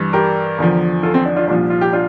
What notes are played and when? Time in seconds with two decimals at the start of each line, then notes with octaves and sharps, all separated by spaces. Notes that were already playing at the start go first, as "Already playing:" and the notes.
Already playing: G2 E3
0.13 G4 A#4
0.58 E2 D3 F3
1.03 F4 A4
1.14 C4
1.25 D4
1.36 D4 F4
1.47 C2 A#2 F3 D4 F4
1.70 F4
1.81 G4
1.93 D4 F4